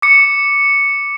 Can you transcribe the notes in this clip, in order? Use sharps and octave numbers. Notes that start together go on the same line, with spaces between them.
D6 C#7